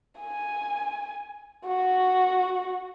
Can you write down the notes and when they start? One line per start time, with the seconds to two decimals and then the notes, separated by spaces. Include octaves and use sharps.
0.20 G#5
1.66 F#4